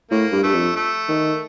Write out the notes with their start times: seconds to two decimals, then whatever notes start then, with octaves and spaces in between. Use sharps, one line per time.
0.11 A2 A#3
0.32 G2
0.43 G2 A3
0.54 F2
0.76 A3
1.09 D#3